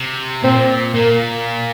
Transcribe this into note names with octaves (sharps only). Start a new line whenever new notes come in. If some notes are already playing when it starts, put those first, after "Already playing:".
Already playing: C3
A#2 C4
A#2 A#3